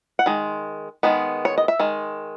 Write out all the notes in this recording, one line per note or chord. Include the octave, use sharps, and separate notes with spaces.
F#5
D#3 G#3
D#3 G#3 B3
C#5
D#5
E5
D#3 G#3